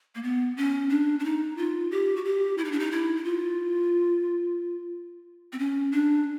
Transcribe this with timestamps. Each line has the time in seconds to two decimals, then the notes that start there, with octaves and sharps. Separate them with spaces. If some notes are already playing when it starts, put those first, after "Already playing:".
0.15 A#3
0.23 B3
0.57 C#4
0.90 D4
1.20 D4
1.24 D#4
1.57 F4
1.91 G4
2.16 F#4
2.25 G4
2.58 E4
2.64 D#4
2.72 D4
2.79 D#4
2.92 E4
3.17 E4
3.24 F4
5.53 C4
5.59 C#4
5.92 D4